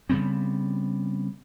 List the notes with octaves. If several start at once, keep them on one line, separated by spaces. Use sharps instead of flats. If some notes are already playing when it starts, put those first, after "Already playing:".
C#3 G3 B3 C4